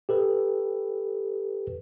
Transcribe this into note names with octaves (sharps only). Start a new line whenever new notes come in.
G4 A4 B4